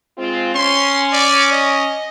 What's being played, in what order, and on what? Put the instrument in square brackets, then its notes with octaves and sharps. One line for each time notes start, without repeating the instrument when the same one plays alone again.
[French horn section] G#3 C4 F4
[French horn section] C#4 [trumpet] C6
[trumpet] D5
D#5